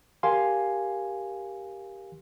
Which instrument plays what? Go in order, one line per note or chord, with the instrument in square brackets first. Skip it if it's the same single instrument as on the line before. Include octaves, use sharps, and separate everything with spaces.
[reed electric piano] G4 A#4 F5 G#5 C6